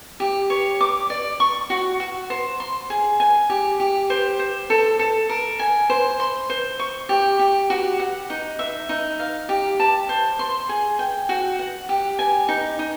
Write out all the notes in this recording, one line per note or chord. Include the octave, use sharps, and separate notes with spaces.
G4
C#5
D6
D5
C#6
F#4
F#4
C5
C6
G#4
G#5
G4
G4
C5
C5
A4
A4
A#4
G#5
C5
C6
C5
C#6
G4
G4
F#4
F#5
D#4
E5
D#4
F5
G4
A5
C5
C6
G#4
G5
F#4
F#5
G4
G#5
D#4
D#4